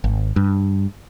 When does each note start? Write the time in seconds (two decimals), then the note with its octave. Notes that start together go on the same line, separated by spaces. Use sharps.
0.04 G#1
0.36 G2